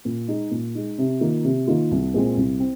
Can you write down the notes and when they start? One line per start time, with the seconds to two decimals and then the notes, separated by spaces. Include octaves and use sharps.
0.05 A#2
0.28 G#3 D#4
0.51 A#2
0.75 G#3 D#4
0.98 C3
1.21 D#3 A#3 F4
1.44 C3
1.67 D#3 A#3 F4
1.91 C2
2.14 A#2 G#3 C4
2.37 C2
2.60 C4